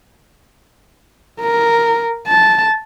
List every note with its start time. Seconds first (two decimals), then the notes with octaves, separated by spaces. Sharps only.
1.41 A#4
2.28 A5